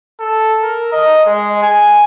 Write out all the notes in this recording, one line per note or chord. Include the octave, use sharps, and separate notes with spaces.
A4
A#4
D#5
G#3
G#5